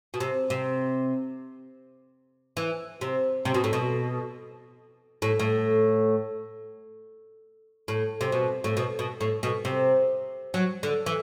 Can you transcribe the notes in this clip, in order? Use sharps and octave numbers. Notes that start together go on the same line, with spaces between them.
B2
C3
C3
E3
C3
C3
B2
A2
B2
A2
A2
A2
C3
B2
A2
B2
B2
A2
B2
C3
F#3
D3
E3